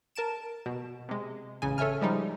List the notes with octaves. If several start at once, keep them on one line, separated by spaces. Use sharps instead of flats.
A#4 A5 D7 E7
B2
C3 G#3
A1 C#3 G#5
A4 C#5 E5 G#5 F6
F3 G3 G#3 D#4